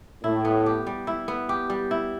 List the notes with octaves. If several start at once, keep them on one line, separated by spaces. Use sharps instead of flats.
A2 E4
B3
G4
G3
E4
B3
G4
G3
E4